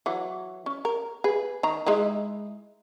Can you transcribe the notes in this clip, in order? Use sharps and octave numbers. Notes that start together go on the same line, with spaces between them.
E3 F#3
C#4
A#4
G#4 B4
D#3 A#5
G#3 D#4 E4